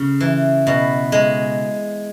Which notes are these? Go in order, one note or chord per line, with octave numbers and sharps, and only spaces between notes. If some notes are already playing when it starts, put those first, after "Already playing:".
Already playing: C#3 C#4
E3
B2
G#3